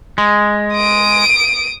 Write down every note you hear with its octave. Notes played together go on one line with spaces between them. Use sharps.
G#3
D#6 D7